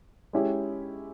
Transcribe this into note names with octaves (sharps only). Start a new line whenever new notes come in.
G#3 C#4 E4 G4